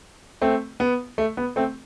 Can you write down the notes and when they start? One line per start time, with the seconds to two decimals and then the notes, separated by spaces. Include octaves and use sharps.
0.42 A3 C4
0.80 B3
1.18 A3
1.37 B3
1.56 A3 C4